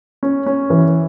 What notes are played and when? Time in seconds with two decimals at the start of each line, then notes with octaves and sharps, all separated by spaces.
0.23 C#4
0.46 C#4
0.70 E3